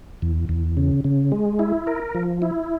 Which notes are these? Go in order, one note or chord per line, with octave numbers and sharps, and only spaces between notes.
E2
E2
C#3
C#3
G#3
E4
A#4
F3
E4